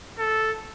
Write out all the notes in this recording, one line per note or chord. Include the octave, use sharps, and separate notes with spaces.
A4